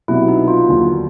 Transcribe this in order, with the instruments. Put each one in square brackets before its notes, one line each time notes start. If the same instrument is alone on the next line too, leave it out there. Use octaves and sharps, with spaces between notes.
[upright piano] C2 B2 F#3 B3 [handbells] E4
[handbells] D#4
F4
[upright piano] D#2 D3 F#3